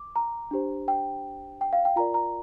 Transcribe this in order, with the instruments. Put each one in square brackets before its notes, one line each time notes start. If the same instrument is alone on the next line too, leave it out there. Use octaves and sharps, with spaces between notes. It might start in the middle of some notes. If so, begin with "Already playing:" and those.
Already playing: [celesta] D6
A#5
D4 G4 C5
G5
G5
F5
G5
F4 A#4 D5 A#5
A#5